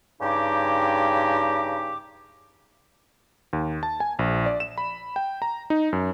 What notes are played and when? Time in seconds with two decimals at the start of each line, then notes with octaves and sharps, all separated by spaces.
0.20 G2 C#3 D#4 G4 D6
3.53 D#2
3.83 A5
4.00 G#5
4.19 A#1
4.46 D5
4.60 E7
4.78 B5
5.16 G5
5.42 A#5
5.70 D#4
5.93 F#2